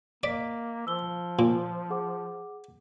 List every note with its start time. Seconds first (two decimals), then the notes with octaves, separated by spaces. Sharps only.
0.23 A#3 D5 D#5 B6
0.87 F3 E6 G7
1.39 A#2
1.90 G#4 F#5 D6